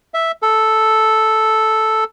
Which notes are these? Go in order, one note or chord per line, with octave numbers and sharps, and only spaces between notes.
E5
A4